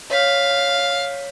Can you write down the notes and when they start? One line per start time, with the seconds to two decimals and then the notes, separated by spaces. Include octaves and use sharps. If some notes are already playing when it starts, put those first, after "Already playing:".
0.11 C#5 F5 B6